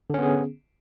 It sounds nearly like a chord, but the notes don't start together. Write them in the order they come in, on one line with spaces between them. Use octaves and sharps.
D3 C#4 B3 G#4